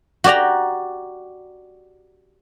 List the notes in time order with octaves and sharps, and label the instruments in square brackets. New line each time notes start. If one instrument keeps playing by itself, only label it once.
[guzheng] F#4 G4 D5 G5 A#5